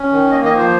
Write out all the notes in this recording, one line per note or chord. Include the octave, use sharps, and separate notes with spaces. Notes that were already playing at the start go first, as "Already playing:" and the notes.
Already playing: C#4
D#3
A#3 D#5
D#5
F3
C5